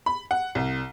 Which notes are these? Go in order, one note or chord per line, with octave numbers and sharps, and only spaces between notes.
B5
F#5
C2